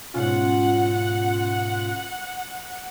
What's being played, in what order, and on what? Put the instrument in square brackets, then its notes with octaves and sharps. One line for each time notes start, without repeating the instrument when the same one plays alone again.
[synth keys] G#2 B2 C#4 [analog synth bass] F4 [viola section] F#5